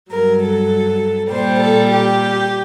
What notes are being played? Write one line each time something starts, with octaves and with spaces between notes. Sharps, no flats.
G2 F#3 A#4
A4
A#2 G3 C5
A4
G4